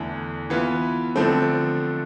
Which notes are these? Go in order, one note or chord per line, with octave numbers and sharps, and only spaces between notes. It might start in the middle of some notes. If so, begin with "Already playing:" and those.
Already playing: E2 D3 A3 E4
E3 B3 F4
D3 F3 A3 C4